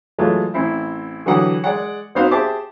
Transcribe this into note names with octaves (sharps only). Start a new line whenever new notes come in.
E3 F#3 G#3 A3 F4
A1 C4 E4
D3 E3 F#3 G4 F#5 D#6
G#3 D5 F#5
B3 C4 D#4 F#4 C5 F5
G4 G#4 C5 E5 A5 D6